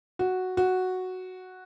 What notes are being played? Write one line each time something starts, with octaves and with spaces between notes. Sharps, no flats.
F#4
F#4